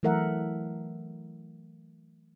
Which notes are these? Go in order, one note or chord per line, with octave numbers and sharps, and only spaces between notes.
E3 F#3 A3 A#4 E5 F#5